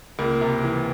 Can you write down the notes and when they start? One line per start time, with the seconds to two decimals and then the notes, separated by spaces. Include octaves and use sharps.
0.19 C#2 A#3
0.41 C3
0.64 E3